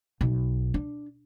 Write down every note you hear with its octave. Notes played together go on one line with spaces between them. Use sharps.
B1
D4